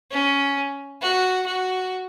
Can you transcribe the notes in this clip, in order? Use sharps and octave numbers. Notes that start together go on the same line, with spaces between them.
C#4
F#4
F#4